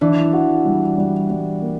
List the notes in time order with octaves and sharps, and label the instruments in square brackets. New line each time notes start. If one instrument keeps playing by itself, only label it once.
[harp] E3 [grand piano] D4
[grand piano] F#4
G3
G3
G3
A#3